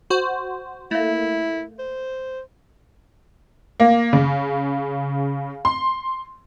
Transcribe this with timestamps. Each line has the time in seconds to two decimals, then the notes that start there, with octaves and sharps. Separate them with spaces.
0.10 F#4 C5
0.91 A3 A#3 E4
1.79 C5
3.80 A#3
4.13 C#3
5.65 C6